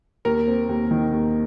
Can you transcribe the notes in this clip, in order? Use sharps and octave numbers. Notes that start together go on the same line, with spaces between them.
D#2 A#4
C4
D#2
D#3
D#2